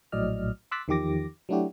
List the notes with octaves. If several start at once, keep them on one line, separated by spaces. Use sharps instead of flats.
A#1 A2 F#3 D5 D#5 F6
C6 D6 E6 F#6 A6 B6
E2 D#3 F3 G4 D6 A#6
F#3 A3 D4 E4 F#4 G4